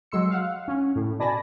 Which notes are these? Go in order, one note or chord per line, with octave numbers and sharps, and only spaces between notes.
F#3 G#3 C6 E6 C#7
F5 F#5
C#4
A2
B2 D5 G#5 A5 B5 A#6